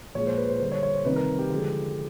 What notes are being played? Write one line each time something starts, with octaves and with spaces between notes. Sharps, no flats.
A#2 F3 G#3 C#5
C5
B4
C5
D3 G3 C5
C#5
C#5
C5
C3 D#3 G3 B4
A#4
G4
D3 F3 G#3